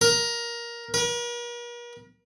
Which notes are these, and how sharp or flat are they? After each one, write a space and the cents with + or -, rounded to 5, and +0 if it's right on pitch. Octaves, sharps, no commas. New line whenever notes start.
A#4 +15
A#4 +45